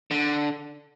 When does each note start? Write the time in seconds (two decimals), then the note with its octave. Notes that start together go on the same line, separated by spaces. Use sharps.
0.11 D3